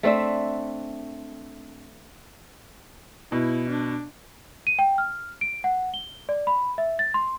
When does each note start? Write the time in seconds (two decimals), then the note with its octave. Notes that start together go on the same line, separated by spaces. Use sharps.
0.03 A3 C4 D4 E5
3.32 B2 E4
3.69 D4
4.67 D#7
4.79 G5
4.98 F6
5.41 D7
5.64 F#5
5.94 G7
6.29 D5
6.47 B5
6.78 E5
6.99 A6
7.14 C6